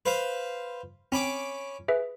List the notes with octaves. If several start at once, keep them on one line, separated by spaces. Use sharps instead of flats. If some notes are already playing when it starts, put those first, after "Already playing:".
B4 C5 F5
C4 C#4 B5 D6
G#4 B4 E5